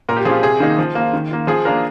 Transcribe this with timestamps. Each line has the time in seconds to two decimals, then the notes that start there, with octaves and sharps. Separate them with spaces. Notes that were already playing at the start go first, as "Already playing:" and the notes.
0.09 A#2 A#4
0.17 G4
0.25 F3 G#4
0.28 C4 F4
0.43 C3 G#4
0.60 D#3 A#3 D#4
0.78 F3
0.95 A#3 F4
1.13 D#3
1.31 A#3 F4
1.47 F3 G#4
1.65 A#3 D4 F4 A#4